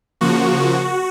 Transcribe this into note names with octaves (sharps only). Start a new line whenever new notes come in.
C#3 F3 A#3 F#4